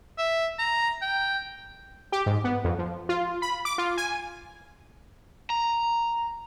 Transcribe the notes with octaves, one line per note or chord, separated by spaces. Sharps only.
E5
A#5
G5
G4
G#2
B3
F2
F3
F4
B5
D6
F4
G#5
A#5